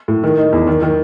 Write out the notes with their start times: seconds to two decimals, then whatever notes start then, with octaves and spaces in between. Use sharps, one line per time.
0.08 A2
0.23 D#3
0.38 D#4
0.52 E2
0.67 D#3
0.82 D#3